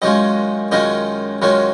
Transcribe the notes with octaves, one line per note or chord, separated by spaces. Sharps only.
F#2 D#3 G#3 C#4 F4 D#5
F#2 D#3 G#3 C#4 F4 D#5
F#2 D#3 G#3 C#4 F4